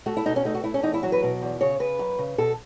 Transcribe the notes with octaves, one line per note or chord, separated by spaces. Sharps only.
A3 F#4
E4
B2 D#4
C#4
A3 D#4
F#4
A3 E4
C#4
E2 D#4
E4
F#3 F#4
B4
B2
E2
C#3 C#5
C#3 B4
F#2
C#3
B2 A4